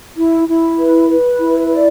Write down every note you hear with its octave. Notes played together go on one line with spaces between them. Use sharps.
E4
E4
B4
B4
E4
D5